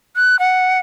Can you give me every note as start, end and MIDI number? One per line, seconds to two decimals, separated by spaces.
0.16 0.39 90
0.39 0.79 78